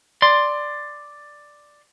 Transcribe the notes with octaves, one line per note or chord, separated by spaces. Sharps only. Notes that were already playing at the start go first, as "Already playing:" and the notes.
D5 C6